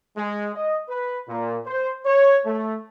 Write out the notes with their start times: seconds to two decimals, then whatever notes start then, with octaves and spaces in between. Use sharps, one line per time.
0.17 G#3
0.56 D#5
0.89 B4
1.29 A#2
1.67 C5
2.06 C#5
2.45 A3